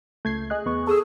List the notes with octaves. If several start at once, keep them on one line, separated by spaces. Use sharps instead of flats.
C#2 A3 G6 G#6 C7
G#4 D#5 F#6
E2 B3 C#6
G#4 A4 D#6 E6